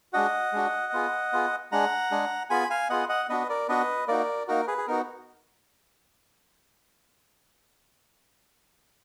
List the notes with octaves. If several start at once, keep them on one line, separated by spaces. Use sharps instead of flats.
G#3 D4 F#4 D#5 F#5
G#3 D4 F#4
B3 F4 G#4
B3 F4 G#4
G#3 D4 G#4 F#5 A#5
G#3 D4 G#4
B3 F4 G#4 G#5 B5
F5 G#5
B3 F4 G#4 D#5 F#5
D#5 F#5
B3 D4 F#4 B4 D#5
A#4 D5
B3 D4 F#4 B4 D#5
A#3 D#4 F#4 A#4 D5
A#3 D#4 F#4 A#4
G#4 B4
G#4
B3 D#4 F#4 A#4